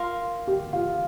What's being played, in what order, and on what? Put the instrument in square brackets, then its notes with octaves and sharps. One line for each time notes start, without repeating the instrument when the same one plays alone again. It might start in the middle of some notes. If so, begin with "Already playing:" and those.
Already playing: [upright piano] F4 [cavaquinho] A#4 F5 C6
[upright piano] G4
F4